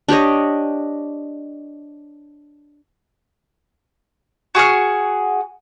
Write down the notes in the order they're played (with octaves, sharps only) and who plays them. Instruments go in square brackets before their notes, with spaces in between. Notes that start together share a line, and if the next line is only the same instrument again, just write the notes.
[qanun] D4 G4 C#5 D#5
[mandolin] F#4 G#4 C#6 F6